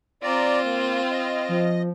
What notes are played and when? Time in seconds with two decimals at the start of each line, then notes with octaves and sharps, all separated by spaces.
0.23 C4 F4 D5 A#5
0.64 A#3
1.11 D#5
1.49 F3